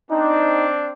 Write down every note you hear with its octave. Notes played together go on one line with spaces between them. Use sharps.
C4 D4 D#4